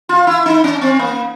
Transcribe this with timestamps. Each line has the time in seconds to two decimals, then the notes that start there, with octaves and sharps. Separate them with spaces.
0.09 F4
0.27 E4
0.46 D#4
0.64 C#4
0.81 C4
0.99 A#3